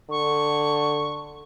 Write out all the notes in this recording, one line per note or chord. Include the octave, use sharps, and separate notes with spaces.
D3 C#6